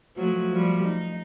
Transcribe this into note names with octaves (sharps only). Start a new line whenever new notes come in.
F3 F#3 A3
F3 G3
D#4